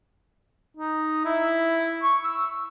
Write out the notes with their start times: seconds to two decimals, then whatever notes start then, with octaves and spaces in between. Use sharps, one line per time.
0.77 D#4
1.25 E4
2.02 C#6
2.24 E6